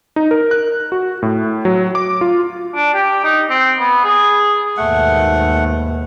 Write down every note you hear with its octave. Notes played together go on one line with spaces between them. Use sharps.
D#4
A#4
F#6
F#4
A2
F#3
D6
F4
D4
G4
D#4
C4
B3
G#4
D#2 G#2 B2 A3 F#5